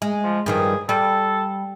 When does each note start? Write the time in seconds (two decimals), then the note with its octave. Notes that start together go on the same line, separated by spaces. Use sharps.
0.02 G#3
0.24 F3
0.46 G2 D#3 F3 G#4
0.89 G3 A4